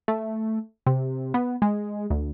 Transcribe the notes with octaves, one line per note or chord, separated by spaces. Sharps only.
A3
C3
B3
G#3
D2